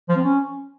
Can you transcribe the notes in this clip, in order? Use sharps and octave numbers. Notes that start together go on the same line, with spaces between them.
F3
C4
C#4